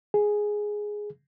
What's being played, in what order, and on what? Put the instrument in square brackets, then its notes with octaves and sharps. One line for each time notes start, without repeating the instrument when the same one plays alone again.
[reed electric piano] G#4